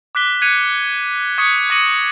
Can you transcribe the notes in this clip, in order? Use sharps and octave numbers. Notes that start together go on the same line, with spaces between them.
D6 F#6 B6 G7
F#6 G#6 B6 C#7 D#7 F7
C#6 D#6 F#6 G#6 B6 C#7
D6 G#6 A#6 C#7 D#7 F#7